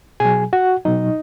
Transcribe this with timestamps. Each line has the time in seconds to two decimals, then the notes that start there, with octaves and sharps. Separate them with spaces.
0.20 B2 F#3 G#4 G#5
0.53 F#4 F#5
0.85 B2 F#3 D#4 D#5